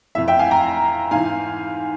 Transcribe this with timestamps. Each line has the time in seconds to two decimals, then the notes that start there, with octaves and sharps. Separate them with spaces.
0.15 F2 E3 E5
0.28 E5 G5
0.39 F5 G#5
0.51 G5 A#5
1.11 G#2 E3 F5 G#5